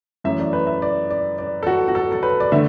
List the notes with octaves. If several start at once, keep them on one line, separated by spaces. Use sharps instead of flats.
F#2 E3 A3 E5
D5
B4
E5
D5
D5
D5
A4
F#4
F#4
A4
A4
B4
D5
D3 A3 E5